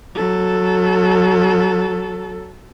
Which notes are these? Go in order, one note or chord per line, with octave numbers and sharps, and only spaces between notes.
F#3 A4